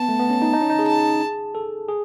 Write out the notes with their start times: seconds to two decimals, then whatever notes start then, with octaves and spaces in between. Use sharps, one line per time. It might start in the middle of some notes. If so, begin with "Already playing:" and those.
Already playing: B3 A5
0.09 A3
0.20 B3
0.30 C#4
0.42 D#4
0.53 D#4
0.61 C#4
0.70 D#4
0.79 G#4
0.87 A5
1.55 A4
1.89 G#4